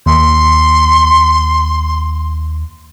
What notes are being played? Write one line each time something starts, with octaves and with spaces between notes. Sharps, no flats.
D#2 C6